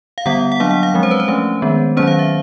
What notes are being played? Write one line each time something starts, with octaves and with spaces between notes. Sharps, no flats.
F5
D3 G3 B3 F#5
F#5
F#3 A#3 D4 F5
F#5
F5
F3 G#3 C4
C5
B4
C5
F3 A3 C#4
D#3 G#3 B3
D#3 F#3 A#3 C#4 C5
F5
E5